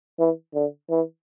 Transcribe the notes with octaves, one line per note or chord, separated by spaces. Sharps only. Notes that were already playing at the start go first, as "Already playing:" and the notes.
E3
D3
E3